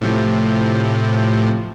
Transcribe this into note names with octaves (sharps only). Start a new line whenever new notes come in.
A2 C3 F3